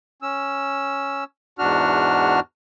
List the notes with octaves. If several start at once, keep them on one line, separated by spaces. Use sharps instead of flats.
C#4 E6
E2 G#2 D4 F#4 F6